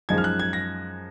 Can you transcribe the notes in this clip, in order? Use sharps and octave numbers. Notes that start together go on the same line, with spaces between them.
F#2 F3 G#3 D#4 G#6
F6
F#6
G#6
A#6